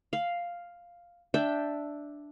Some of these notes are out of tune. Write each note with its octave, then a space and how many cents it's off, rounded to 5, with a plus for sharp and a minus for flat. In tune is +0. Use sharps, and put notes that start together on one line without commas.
F5 +0 B5 +15
D4 +0 E5 +0 G5 +0